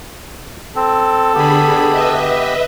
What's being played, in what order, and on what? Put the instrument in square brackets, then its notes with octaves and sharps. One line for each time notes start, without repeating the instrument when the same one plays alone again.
[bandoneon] C4 [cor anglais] A4
[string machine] D3 G#4 B5 [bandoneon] B3 G4
[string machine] B4 D#5 E5